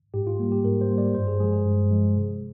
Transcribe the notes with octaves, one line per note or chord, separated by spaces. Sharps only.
G#2 G4
F4
G3 A#3
G4
G#2 A#4
C5
G3 A#3
D5
G2 C5
G#4
F3 G#3 G#4
G#4
G2
F3 G#3
C3